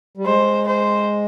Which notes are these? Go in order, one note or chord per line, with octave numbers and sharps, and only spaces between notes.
G3
G#3 C5
C5